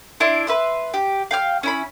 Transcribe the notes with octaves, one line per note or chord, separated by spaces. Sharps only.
D4 E4 C6
B4 E5 C6
G4
F5 G5 F6
C#4 E4 B5